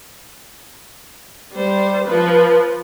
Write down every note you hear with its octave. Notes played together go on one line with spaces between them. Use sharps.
G3 C5
F3 B4